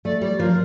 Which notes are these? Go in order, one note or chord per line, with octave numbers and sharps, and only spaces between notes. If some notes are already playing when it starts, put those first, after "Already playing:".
A3 D5
G3 D5
F3 A#4